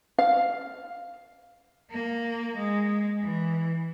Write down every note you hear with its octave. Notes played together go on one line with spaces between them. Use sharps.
F5
A#3
G#3
E3